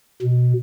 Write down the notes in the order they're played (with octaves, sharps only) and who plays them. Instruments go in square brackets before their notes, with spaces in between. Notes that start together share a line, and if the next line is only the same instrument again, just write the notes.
[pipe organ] B2